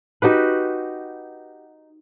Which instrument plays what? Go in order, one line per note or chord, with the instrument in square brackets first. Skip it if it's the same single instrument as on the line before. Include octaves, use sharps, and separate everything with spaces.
[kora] D#4 F#4 G4 B4